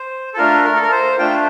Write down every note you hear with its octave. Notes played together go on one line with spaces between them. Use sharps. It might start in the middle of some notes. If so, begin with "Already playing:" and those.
Already playing: C5
A4
A3 D4 F4 A#4
A#4
A4
A#4
C5
A3 D4 F4 G5